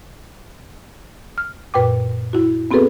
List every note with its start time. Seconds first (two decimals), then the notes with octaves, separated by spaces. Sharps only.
1.38 F6
1.74 F#2 A#2 B4 G5 D6
2.33 E4 F#4
2.71 B3 C4 F#4 G#4 A4 B4